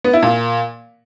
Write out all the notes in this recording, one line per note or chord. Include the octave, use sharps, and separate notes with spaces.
B3
E4
A#2